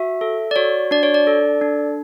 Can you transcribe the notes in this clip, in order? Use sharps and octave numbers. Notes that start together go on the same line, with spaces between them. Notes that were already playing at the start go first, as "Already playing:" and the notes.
Already playing: F#4 E5
A4
D5
F#4 C#5
D4 D5
C#5
D5
A4
D4